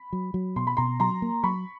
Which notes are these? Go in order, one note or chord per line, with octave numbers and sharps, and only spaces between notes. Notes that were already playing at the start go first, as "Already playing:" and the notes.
Already playing: B5
F#3
F#3
B2 C6
B5
B2 A#5 C6
F#3 A#5 C6
A#3
F#3 B5 C#6